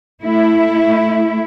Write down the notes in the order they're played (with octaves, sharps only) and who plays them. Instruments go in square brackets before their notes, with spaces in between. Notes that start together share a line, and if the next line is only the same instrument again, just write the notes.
[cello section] A3 E4